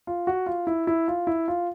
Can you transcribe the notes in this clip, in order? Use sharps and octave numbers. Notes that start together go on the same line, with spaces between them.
F4
F#4
F4
E4
E4
F4
E4
F4